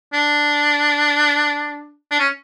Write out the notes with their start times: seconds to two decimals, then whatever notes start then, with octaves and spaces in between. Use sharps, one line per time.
0.14 D4
2.11 D4
2.20 C#4